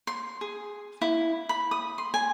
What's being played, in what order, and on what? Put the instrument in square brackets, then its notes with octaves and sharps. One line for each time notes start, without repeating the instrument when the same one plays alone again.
[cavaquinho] C6
G#4
E4
B5
D#6
C6
G#5